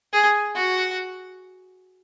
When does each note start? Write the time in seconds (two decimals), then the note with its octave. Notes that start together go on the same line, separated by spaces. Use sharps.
0.13 G#4
0.56 F#4